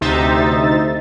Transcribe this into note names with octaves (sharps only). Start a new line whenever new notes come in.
D2 C3 D#4 C5 E5 A6